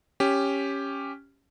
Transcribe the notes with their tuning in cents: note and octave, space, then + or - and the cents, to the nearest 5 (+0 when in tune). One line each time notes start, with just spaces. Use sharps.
C#4 +0 G4 +5